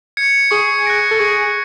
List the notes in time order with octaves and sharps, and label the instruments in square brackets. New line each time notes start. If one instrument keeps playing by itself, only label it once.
[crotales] G#6 C#7
[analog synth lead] G#4 [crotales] C#6
[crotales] F#6 A#6 D7
[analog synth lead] A4
[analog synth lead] G#4 [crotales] C#6